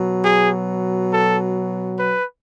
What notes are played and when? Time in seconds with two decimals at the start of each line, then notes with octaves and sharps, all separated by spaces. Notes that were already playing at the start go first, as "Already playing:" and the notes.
Already playing: B2 F#3
0.23 G#4
1.11 A4
1.99 B4